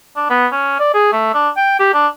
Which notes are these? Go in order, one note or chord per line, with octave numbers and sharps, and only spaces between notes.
D4
B3
C#4
D5
G#4
A3
D4
G5
G4
D4